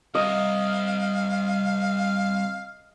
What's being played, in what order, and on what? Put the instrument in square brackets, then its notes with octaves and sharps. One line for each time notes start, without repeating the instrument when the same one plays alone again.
[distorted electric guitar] C2 [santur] D#5 [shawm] F5